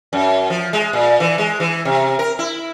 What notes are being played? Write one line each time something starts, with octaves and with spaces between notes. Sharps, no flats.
F#2
F3
G#3
A#2
E3
G#3
E3
C3
A#4
E4